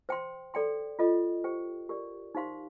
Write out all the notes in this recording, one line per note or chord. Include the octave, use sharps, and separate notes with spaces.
C5 G5 C6
A4 D5 G5 C6
F4 A4 D#5
G4 C5 G5
G4 A#4 D5
D#4 G4 C5 F5 C6